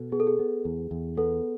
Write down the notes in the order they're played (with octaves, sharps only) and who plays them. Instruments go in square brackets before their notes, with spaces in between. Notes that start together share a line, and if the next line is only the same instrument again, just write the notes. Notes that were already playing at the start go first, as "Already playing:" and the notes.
Already playing: [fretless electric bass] B2 [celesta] A4
[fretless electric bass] B3 [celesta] G#4
[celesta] A4
G#4
[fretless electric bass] B3
E2
E2
[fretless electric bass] B3 [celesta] A4